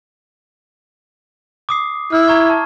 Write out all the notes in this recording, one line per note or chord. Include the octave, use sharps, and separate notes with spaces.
D6 D#6 C7
E4 F6
A#5 C#6 G#6
A5